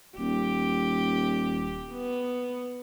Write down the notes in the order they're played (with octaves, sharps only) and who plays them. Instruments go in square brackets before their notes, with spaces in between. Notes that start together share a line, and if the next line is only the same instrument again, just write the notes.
[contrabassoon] D#1 [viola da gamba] G4
[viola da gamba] B3